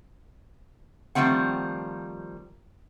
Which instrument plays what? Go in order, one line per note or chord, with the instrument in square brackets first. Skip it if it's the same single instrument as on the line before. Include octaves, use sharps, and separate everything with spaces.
[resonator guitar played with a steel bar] D#3 F3 G3 A3 C4 F#5